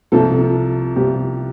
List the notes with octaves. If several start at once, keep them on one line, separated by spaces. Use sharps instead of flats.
C2 C3 F3 A4
C2 C3 F3 G4